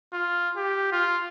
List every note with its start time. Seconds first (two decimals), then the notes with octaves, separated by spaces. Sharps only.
0.13 F4
0.56 G4
0.92 F4